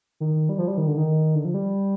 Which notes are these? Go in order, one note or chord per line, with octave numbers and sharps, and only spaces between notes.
D#3
G3
F3
G3
D#3
D3
D#3
D3
F3
G3